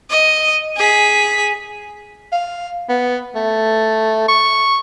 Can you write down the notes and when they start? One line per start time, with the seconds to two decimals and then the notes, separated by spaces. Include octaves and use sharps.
0.10 D#5
0.77 G#4 B6
2.32 F5
2.89 B3
3.35 A3
4.28 C#6